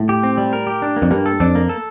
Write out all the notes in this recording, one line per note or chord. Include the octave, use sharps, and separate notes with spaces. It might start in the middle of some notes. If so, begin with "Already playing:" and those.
Already playing: A2
G4
C4
G3
A#4
G4
D4
A#3
F2
G2 A#3
A4
F2 D4
A#3
A4